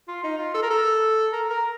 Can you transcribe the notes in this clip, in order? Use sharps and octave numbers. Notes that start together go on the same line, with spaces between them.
F4
D#4
F4
A4
A#4
A4
A#4
A#4